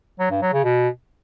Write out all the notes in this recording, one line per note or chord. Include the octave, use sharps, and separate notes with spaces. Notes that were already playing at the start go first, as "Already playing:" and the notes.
F#3
G2
F#3
C#3
B2